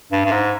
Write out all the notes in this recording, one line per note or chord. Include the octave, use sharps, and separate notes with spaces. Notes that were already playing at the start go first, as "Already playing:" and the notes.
G2
G2
G#2